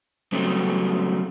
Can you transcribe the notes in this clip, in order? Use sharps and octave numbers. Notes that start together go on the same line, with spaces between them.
C#3 F#3 G3 A3 B3 C4